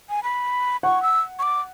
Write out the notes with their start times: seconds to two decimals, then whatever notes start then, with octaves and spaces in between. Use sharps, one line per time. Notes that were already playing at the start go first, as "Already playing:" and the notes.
0.10 G#5
0.23 B5
0.83 F#5 C#6
1.03 E6
1.39 C#6
1.43 D6